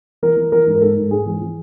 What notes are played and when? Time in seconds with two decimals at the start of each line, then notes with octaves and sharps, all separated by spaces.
0.22 E3 A#4
0.37 E3
0.52 E3 A#4
0.67 G#2
0.75 A#4
0.82 G#2 A4
0.97 G#2
1.11 G#2 G#4
1.26 E3
1.41 E3